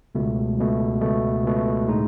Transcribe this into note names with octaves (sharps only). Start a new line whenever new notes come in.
C#2 B2 A3
C#2 B2 A3
C#2 B2 A3
C#2 B2 A3
A2 G#3 D#4